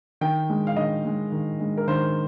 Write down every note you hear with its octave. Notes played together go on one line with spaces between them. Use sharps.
D#3 G5
G#3
F5
D#3 D#5
G#3
D#3
G#3
A#4
D#3 C5